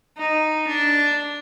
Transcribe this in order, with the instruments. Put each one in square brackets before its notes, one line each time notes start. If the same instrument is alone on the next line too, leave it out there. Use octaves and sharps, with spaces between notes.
[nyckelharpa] D#4
D4